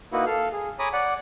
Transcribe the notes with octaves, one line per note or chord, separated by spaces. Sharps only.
A#3 D#4 E4 F#4 B4
A4 F5
G#4
C#5 G#5 A#5 B5 D6 D#6
D5 F#5